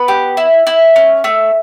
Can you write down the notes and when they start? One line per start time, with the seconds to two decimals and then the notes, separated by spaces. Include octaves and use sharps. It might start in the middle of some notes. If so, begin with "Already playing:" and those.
Already playing: B3 B4
0.08 G4
0.37 E4
0.67 E4
0.96 C#4
1.24 A3